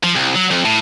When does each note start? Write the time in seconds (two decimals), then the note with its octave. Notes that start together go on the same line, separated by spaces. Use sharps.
0.04 F3
0.16 C2
0.35 F#3
0.51 F2
0.65 A2